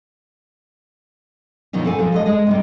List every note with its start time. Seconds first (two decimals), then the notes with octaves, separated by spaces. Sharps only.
1.73 B2 D#3 F3 F#3 C#4
1.85 C4 A4 F#5 G#5
1.99 F3 F#3 A4
2.12 G#3 A4 D#5
2.26 G#3 D#5
2.47 C3 G3 D#4